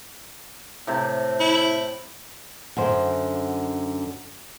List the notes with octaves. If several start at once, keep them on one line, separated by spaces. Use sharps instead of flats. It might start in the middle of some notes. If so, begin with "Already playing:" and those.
A2 C3
E4
F#2 D3 C5